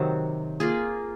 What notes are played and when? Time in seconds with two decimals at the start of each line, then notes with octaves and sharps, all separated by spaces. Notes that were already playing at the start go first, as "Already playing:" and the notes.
Already playing: C3 D#3 F#3 C4
0.60 A#3 F4 G#4